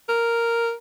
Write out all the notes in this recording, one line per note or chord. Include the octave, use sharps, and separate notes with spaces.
A#4